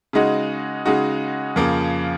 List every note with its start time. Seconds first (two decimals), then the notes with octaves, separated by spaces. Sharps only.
0.13 C#3 G#3 D#4 F#4
0.85 C#3 G#3 D#4 F#4
1.56 F2 C#3 F3 A#3